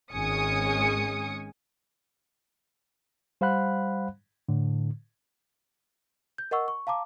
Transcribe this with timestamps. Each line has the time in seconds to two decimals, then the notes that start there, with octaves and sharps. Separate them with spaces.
0.13 G#1 G#3 C#4 G#5 D#6 C#7
3.41 G3 C5 F5 F#5 B5 F#6
4.49 A2 D3
6.38 G6
6.51 A#4 D#5 F#5 C#6 E6
6.68 C#6
6.87 F5 A5 A#5 D6